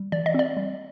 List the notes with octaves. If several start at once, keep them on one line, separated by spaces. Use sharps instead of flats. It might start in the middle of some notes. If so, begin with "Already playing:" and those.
Already playing: G3
E3 D5
D#5
C4 D5
G3